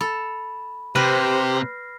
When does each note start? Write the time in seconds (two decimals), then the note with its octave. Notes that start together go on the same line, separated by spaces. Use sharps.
0.01 A4 B5
0.96 C3 G4 B4 C5 F6 A#6 C7